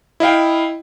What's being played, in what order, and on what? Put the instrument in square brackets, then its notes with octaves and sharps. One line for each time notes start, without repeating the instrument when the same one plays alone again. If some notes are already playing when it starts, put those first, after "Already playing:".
[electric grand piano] E4 D#5 F5 G5